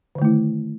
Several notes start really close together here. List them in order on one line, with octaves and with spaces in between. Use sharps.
D3 D#3 A3 E4